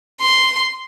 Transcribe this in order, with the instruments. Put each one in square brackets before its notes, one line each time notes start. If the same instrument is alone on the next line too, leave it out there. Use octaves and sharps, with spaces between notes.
[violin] C6